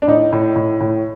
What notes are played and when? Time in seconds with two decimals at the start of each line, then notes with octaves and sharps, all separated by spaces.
0.02 D4
0.07 A2 D#4
0.32 A2
0.56 A2
0.81 A2